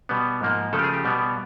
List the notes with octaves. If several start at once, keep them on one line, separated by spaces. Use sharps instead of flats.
B2 G3 B3
G#2 F3 A#3
C#3 F3 A3 A4
G4
G#4
G4
B2 G3 B3